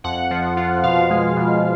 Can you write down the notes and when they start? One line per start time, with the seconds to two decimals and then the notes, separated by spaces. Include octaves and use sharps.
0.04 F2 F#5
0.31 F3
0.57 F4
0.83 B2 F5
1.10 G#3
1.36 B2